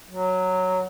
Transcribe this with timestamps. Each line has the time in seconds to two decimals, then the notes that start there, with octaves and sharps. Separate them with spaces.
0.09 F#3